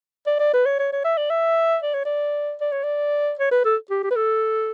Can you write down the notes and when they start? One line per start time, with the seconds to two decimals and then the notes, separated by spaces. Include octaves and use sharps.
0.26 D5
0.39 D5
0.53 B4
0.66 C#5
0.79 C#5
0.92 C#5
1.04 E5
1.17 D5
1.30 E5
1.82 D5
1.94 C#5
2.05 D5
2.61 D5
2.72 C#5
2.84 D5
3.39 C#5
3.51 B4
3.64 A4
3.90 G4
4.03 G4
4.11 B4
4.16 A4